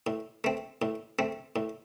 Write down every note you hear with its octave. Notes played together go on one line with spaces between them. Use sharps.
A2
A3 C4
A2
A3 C4
A2